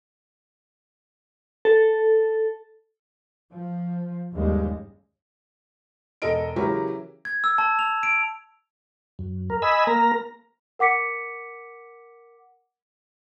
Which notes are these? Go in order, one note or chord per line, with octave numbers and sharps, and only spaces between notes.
A4
F3
G1 D#2 C#3 G3 G#3
E1 A4 D#5 D7
C#3 E3 F#3 E4 G4 A#4
G#6
E6
A5
F7
D7
F#2
A#4
D#5 G#5 B5 E6
A#3 A#4 A#5
A#4 F#5 D6 B6 C#7